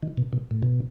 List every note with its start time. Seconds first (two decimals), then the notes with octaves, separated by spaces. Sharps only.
0.03 D#3
0.18 B2
0.33 B2
0.51 A2
0.63 B2